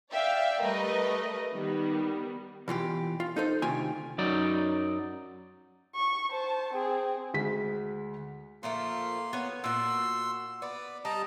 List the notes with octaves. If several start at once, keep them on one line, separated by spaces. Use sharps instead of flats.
D5 E5 F5 G5
G3 A3 A#4 B4 D#5
D#3 G3 B3
B2 E3 F4 G4
F4
D#4 A4 C5
D2 C3 D#3 F4 G4 G#5
F#2 F#3 D#4 D5
C#6
C5 A5
C4 G#4
D2 G#3 B6
A#2 F3 A3 A#3 C6
B3 C#5
A#2 F#4 C6 E6
B3 D5
G3 D#5 A5 A#5